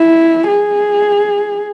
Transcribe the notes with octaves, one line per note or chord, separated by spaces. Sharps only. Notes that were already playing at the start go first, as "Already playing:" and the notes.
Already playing: E4
G#4